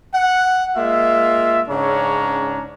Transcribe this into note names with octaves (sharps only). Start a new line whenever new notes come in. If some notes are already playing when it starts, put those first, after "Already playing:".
F#5
G#3 A#3 F4 E5
G#2 C#3 C#4 D4 C#5 A#5